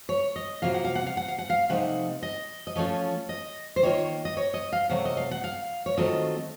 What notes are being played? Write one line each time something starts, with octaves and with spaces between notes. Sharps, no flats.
C#5
D#5
C3 F#3 A#3 F4 F5
F#5
F5
F#5
F5
F#5
F5
F#5
F5
C3 F3 A3 D#4 F#5
D#5
D#5
F3 A3 C#4 F4 C#5
D#5
C5
D#3 A#3 F4 C#5
D#5
C#5
D#5
F5
C3 F#3 A3 F#5
D#5
F5
F#5
F5
C#5
D#3 F#3 A3 C4 F4 D#5